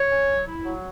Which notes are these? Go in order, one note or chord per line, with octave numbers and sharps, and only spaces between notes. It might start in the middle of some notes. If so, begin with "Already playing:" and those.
Already playing: C#5
C#4
F#3
E4
F#3